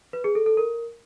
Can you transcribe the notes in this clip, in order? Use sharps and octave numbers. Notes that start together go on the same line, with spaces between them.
B4
G#4
A4
A4
A#4